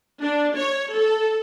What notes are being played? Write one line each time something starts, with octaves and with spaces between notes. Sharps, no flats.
D4
C#5
A4